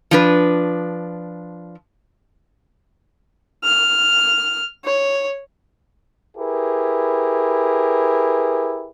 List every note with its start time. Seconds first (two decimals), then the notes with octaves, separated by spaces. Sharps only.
0.11 F3 D4 B4
3.64 F6
4.85 C#5
6.37 E4 G4 G#4 A#4 B4